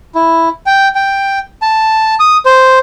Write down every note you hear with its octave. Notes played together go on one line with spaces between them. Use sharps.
E4
G5
G5
A5
D#6
C5